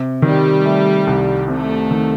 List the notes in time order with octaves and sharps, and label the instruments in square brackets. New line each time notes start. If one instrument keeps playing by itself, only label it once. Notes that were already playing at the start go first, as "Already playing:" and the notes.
Already playing: [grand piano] C3
[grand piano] D#3 [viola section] G3
[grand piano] A3
C2
[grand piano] C3 [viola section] A3
[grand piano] D#3